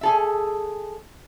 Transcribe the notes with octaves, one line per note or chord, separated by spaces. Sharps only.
G#4 A4 E5